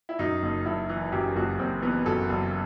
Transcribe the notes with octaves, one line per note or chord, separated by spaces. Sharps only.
E4
F#2 D#4
F#1
F#1 E4
E3
F#2 G4
F#1 F#4
F#1 C4
E3 B3
F#2 A4
F#1